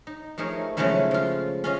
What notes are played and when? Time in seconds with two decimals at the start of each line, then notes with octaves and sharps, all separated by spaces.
0.07 D#4
0.38 F3 A3 D#4 G#4 A#4 C#5
0.77 C#3 F3 F#3 G#3 A3 E4
1.11 F3 F4
1.64 C#4 F4 D#5